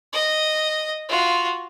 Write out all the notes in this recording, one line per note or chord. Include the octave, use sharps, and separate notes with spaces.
D#5
F4 F#4